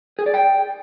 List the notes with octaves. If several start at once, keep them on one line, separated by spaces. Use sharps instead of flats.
G#4
D5
G5